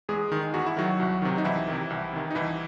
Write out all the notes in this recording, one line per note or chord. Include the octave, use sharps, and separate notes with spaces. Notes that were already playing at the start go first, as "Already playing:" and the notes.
E2 G#3 G#4
D#3
E2 F#4
E4
D#3 F#3 F#4
C2
C3 D#3
D#4
C2 E3 E4
C3 D#3
C2
C3 D#3
D#4
C2 E3 E4